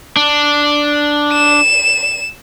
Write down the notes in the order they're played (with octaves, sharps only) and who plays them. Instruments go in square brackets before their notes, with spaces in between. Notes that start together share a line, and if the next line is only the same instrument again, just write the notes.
[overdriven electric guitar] D4
[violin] E7